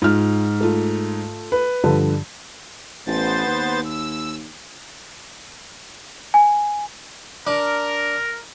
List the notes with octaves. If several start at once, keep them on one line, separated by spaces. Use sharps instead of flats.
G#2 F4 F6
A3 F4
B4
G2 D3 F3
A1 B3 C5 A6
D#2
E6
G#5
D4 A#4